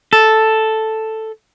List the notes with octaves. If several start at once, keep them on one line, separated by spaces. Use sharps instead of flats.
A4